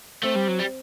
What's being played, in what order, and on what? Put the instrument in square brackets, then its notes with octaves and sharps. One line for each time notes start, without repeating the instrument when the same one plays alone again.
[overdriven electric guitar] A3 [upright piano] C4
[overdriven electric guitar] G3
F#3
G3